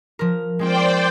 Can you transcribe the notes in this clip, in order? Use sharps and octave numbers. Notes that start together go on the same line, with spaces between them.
F3 A#4
G#3 C4 F4 C5 D5 G5